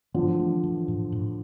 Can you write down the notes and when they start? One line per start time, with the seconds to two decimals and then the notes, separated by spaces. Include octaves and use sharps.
0.14 D3 E3 F3
0.40 A3
0.64 E3
0.88 A2
1.12 A2